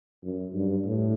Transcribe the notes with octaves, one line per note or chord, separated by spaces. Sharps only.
F#2
G2
A2